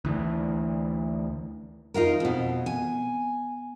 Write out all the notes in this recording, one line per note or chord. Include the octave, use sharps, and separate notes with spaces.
D2 E3
D#4 F4 F#4 A#4
F2 B2
G#5